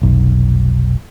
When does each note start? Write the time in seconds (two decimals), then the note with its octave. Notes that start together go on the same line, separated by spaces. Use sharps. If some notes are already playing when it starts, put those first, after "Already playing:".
0.02 F1 B1